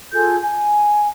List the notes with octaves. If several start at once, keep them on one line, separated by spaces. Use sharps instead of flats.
F4 G#4 A4 G6
G#5